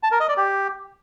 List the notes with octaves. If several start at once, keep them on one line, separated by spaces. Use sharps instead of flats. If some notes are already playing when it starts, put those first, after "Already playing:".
A5
A#4
D#5
D5
G4